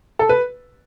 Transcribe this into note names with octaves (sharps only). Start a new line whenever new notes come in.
A4
B4